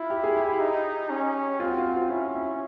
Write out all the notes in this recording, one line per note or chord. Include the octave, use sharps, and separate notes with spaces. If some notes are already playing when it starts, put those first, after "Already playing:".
Already playing: E4 F4
G4
G#4
G4
D#4
C#4
C4 F4
F#4
F4
F#4
F4
C#4 E4
E4